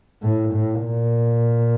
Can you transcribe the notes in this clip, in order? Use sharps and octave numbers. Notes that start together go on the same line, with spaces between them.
A2
A2
A#2